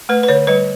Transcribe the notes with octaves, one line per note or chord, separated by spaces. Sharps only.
A3 B4
B4
D3 C#5
G3 B4